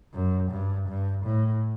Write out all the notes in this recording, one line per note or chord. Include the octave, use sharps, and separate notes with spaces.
F#2
G2
G2
A2